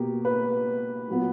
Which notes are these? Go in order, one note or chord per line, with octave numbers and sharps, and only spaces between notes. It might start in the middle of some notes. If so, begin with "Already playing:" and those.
Already playing: B2 A#3 G4
B4
A#2 F#3 B3